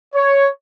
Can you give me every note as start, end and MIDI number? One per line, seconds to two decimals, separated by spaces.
0.15 0.48 73